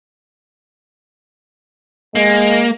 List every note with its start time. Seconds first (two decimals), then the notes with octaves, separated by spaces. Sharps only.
2.15 G#3 A#3